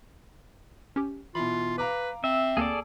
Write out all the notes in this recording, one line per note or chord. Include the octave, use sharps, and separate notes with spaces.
C#4 G4
B2 E3 F4 B5
B4 F5 A#5 D6
C4 E5
D2 A#3 G#4 A4 D5